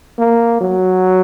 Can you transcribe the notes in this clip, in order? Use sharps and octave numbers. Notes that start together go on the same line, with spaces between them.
A#3
F#3